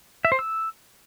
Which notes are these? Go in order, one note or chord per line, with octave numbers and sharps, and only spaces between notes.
E5
C5
E6